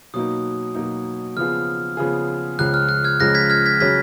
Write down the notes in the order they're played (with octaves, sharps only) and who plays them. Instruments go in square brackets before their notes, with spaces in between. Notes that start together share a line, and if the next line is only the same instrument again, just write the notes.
[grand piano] B2 F#3 A#3 D#4 [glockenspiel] D#6
[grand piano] B2 F#3 A#3 D#4
[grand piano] C#3 F3 B3 F4 G#4 [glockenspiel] F6
[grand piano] C#3 F3 B3 F4 G#4
[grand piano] C#2 C#3 F3 G#3 [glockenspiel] F#6
[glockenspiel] F6
F#6
F6 G#6
[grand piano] C#2 C#3 F3 G#3 [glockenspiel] F#6 A#6
[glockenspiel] G#6 B6
F6 G#6
G#6 B6
[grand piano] C#3 F#3 C#4 [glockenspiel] G#6 B6